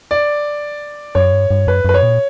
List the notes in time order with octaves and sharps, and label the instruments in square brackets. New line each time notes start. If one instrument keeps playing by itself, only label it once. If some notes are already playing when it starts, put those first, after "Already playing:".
[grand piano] D5
[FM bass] F#2 [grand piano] C#5
[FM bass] G2
G2
[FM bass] F#2 [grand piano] B4
[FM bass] F#2 [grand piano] B4
[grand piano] C#5
[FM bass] A#2